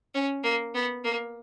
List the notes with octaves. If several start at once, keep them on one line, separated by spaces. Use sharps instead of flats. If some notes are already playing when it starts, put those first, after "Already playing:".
C#4
A#3
B3
A#3